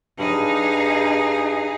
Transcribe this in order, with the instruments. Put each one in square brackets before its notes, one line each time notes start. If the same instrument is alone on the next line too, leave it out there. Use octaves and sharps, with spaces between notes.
[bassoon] G2 [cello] D#4 G#4